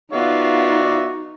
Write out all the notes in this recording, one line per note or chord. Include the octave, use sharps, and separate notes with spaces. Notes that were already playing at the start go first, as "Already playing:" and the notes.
B3 D#4 F4 F#4 D5 E5 F5